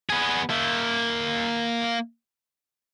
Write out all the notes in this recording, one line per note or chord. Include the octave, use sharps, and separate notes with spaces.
B3 G#4
A#3 E5